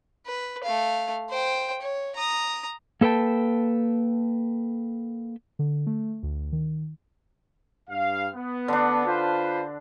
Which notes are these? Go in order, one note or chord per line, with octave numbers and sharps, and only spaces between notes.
B4
A3 F5
C5 G5
C#5
A#5 D#6
A#3 A4 B4 G5 A5
D3
A3
D2
D#3
G2 F5
B3
D3 D4
F4 B4 C5